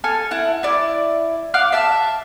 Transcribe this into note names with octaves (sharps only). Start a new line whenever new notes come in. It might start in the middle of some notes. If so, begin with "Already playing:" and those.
A4 G#5 F6
E4 F#5
E4 D5
F5 F#5 D6 F6
E5 A5